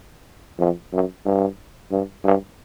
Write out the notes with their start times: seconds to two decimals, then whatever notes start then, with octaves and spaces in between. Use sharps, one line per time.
0.59 F2
0.93 F#2
1.25 G2
1.91 G2
2.24 G2